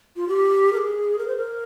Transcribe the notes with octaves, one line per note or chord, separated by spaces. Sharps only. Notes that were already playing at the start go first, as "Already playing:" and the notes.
F4
G4
A#4
G#4
A#4
C5
A#4